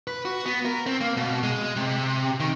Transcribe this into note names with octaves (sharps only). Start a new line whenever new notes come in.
B4
F#4
B3
A#4
C4
A#3
B2
G#3
C3
D#3